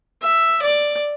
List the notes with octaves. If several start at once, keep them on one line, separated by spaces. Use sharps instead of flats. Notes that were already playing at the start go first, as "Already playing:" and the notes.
E5
D5